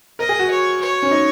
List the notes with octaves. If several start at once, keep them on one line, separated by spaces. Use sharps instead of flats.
A#4 D#5
G#4
F#4
C#5
C#5
C#4
D#4